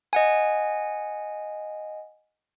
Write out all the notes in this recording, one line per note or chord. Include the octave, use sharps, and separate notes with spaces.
D#5 F#5 G#5